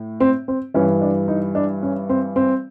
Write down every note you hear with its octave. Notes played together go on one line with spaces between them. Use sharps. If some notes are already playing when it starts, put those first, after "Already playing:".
Already playing: A2
C4
C4
G2 E3 C#4
D4
D#4
D4
C#4
C4
C4